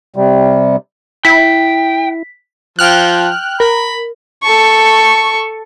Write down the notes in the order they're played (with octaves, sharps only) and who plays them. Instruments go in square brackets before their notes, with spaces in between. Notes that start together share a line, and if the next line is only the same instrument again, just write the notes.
[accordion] C3 G3
[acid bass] E4 [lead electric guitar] G5 [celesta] B6
[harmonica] F3 [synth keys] G5 F6 F#6
[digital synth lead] A#4 [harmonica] B5
[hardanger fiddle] A4 C#6